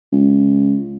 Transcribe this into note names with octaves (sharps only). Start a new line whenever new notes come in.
C#2